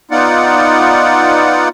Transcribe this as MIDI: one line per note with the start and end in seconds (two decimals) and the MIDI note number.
0.11 1.69 59
0.11 1.69 63
0.11 1.69 65
0.11 1.69 74
0.11 1.69 78